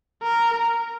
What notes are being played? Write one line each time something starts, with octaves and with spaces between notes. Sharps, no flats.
A#4